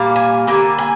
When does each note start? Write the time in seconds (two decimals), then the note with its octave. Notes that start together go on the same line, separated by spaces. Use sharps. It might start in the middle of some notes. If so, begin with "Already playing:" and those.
Already playing: A#2 G3 A#3
0.16 G#5
0.47 D3 G3 A#3 G#5
0.79 G#5